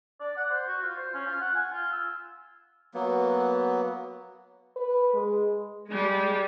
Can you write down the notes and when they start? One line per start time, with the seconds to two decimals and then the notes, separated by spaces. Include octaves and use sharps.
0.20 D5
0.37 F#5
0.50 C5
0.67 F#4
0.82 F4
0.98 C5
1.14 C#4
1.27 F4
1.41 F#5
1.55 G#5
1.72 F4
1.92 E6
2.94 F#3 A#3 B3
4.76 B4
5.13 G#3
5.88 G3 G#3